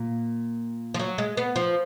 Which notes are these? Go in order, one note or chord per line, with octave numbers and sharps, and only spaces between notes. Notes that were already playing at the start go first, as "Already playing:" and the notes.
Already playing: A#2
F3
F#3
G#3
B3
F3